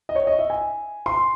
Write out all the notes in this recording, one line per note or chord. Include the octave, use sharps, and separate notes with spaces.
D#5
C#5
D#5
E5
G#5
C6